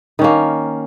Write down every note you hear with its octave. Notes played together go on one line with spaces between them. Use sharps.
D#3 A#3 C#4